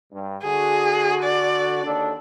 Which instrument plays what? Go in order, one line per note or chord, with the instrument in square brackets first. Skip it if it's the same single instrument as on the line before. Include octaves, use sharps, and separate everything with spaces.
[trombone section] G2
[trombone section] D3 F#4 [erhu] G#4
[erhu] D5
[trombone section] D#2 D4 A4